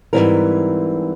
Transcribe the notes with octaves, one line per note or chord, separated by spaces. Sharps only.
G#2 D3 E3 G3 C4 A#4